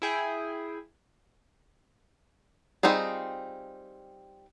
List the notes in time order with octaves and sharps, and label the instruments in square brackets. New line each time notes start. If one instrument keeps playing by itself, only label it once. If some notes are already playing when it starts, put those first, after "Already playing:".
[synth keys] E4 G#4 G5
[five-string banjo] G3 C4 D#4 F4 G#4